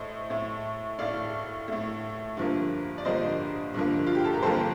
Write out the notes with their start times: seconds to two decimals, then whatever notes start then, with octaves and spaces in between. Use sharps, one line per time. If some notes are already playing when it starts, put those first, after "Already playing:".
Already playing: A2 A3 C5 D#5
0.30 A2 A3
0.99 A2 A3 D5 F5
1.68 A2 A3
2.37 G2 D3 F3 A#3
2.98 D5
3.05 G2 D3 F3 A#3 C5 D#5
3.74 G2 D3 F3 A#3
4.06 F4
4.15 G4
4.25 A4
4.34 A#4
4.42 G2 D3 F3 A#3 A4 C5